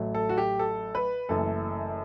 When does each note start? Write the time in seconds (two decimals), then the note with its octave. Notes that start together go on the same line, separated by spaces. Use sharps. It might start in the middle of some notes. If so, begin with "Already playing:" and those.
Already playing: A1 A2 F#3 A3
0.15 A4
0.29 F#4
0.38 G4
0.59 A4
0.95 B4
1.29 F#1 F#2 E3 A3 A4